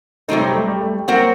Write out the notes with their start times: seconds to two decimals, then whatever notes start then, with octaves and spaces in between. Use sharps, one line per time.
0.28 C3 F#3 A3 C4 D#4
0.40 G3
0.51 A3
0.68 G3
0.81 A3
0.93 G3
1.08 F#3 A#3 C4 F#4